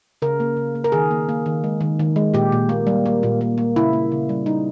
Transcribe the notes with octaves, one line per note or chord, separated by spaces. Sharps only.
C#3 A#4
A#3
C#3
A#3
A#4
D#3 G#4
A#3
A#3
D#3
G#3
D#3
D#3
G#3
A#2 G4
A#2
A#3
G3
A#3
A#2
A#3
A#3
C#3 E4
A#3
C#3
G3
G3 D#4